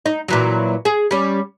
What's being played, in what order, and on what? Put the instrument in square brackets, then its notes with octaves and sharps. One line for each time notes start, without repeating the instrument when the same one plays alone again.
[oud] D#4
A#2 E3 F#3
G#4
G3 C#4